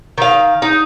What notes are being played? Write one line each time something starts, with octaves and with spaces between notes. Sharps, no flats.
D#3 F5
D#4